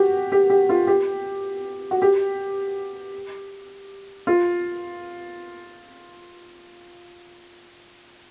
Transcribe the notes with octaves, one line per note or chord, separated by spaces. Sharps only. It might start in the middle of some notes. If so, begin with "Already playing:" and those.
Already playing: F#4 G4
G4
G4
F4
G4
F#4
G4
F4